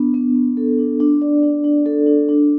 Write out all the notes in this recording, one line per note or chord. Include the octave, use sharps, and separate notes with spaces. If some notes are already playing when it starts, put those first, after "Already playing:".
Already playing: B3 D4
B3
B3
A4
D4
D4
D5
D4
D4
A4
D4
D4